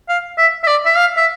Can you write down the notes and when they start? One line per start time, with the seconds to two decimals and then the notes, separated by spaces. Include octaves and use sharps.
0.09 F5
0.38 E5
0.64 E5
0.67 D5
0.85 E5
0.97 F5
1.17 E5